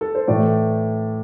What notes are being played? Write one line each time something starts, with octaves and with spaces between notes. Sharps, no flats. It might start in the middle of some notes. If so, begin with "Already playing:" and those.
A4
C5
A2 E3 A3 D5